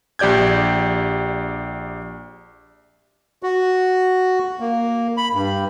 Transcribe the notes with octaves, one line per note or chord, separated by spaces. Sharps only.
A#1 G4 D5 G6 G#6
F#4
A#3
B5
G2